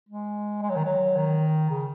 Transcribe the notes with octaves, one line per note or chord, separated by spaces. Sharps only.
G#3
G#3
F#3
D#3
F#3
D#3
C#3